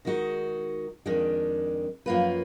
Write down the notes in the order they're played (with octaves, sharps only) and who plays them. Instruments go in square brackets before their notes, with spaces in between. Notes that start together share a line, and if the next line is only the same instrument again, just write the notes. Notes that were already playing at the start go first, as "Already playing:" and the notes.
[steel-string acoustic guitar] D#3 G#3 D#4 F#4
F2 D#3 G#3 D4
F#2 F3 A#3 F4 B4